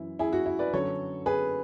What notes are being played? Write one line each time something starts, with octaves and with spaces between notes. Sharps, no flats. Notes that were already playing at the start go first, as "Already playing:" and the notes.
Already playing: F#2 E3 E4
E4 G#4
F#4
E4
B4 D5
F#2 D3 F#3 A4 C#5
G#4 B4